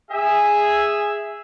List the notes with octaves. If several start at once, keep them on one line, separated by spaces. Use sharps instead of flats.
G#4 E5